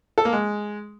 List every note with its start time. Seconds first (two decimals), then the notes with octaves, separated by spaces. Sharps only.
0.18 A4
0.25 A#3
0.33 G#3